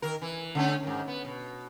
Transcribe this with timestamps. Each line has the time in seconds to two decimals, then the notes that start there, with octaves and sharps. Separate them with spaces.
0.02 D#3 A#4
0.22 E3
0.55 D3 A3 C#4
0.83 G#2 D#3
1.08 B3
1.25 B2